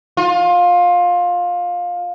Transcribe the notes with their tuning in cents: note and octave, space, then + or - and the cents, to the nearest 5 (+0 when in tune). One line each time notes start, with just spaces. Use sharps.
F4 +20